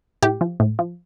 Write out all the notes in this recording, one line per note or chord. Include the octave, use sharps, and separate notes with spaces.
A2 G4
F3
A2
F3